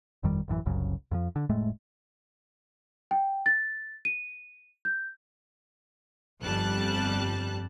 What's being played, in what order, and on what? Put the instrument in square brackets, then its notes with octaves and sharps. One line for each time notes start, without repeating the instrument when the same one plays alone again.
[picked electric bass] G1 F2 D#3 G3
A1 F#2 C#3 E3
F#1 C2 F#2 C#3
F2 D#3 F3
D3
F1 A2 G#3 A3
[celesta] G5
A6
D#7
G6
[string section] G1 F2 G3 A5 F#6